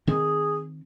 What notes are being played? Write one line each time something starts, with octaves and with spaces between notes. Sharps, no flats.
D#3 C4 G#4